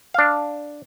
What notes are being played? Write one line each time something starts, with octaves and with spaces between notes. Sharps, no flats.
D4 F5